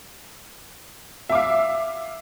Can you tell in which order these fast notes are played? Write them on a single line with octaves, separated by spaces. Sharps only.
E5 D6 F5